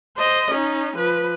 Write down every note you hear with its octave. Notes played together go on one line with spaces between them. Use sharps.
C5 D#5
C#4 D#4
F3 B4